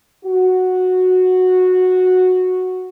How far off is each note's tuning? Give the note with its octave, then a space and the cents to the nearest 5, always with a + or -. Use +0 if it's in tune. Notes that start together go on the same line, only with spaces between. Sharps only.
F#4 -10